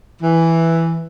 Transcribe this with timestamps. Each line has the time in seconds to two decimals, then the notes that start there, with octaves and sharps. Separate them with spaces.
0.22 E3